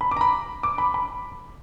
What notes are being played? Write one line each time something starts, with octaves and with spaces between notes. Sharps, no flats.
B5
D6
A#5
B5
D6
B5
B5